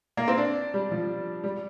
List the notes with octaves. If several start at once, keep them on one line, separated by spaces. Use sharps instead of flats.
A#3
C4
D4
G3
F3
G3